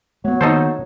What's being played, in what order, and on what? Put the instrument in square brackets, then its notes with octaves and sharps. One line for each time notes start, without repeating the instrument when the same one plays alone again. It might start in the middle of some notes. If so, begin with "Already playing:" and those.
[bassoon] F#3 [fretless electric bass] A3 B3
[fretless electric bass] D#3 A#3 B3 [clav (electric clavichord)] D#4 A4 C5